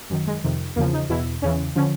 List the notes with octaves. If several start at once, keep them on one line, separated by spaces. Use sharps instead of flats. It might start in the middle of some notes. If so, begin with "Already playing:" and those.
F#2 D#3
G#3
F2 C3 D#3
E2 C#3 F3 A#3
D#4
E2 B2 E4
E2 C#3 E3 C#4
D3 F3 C#4